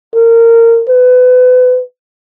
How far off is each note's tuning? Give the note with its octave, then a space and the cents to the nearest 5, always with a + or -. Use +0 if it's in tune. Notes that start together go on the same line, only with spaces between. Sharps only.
A#4 -20
B4 +30